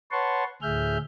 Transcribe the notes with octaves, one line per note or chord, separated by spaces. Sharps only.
B4 C#5 F#5 A5 C6 C#6
D2 A2 G#4 E5 F6 G6